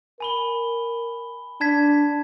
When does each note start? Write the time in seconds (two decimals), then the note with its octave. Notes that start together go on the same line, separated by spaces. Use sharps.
0.20 A#4 G#5 B5 G7
1.61 D4 A5 G#6 B6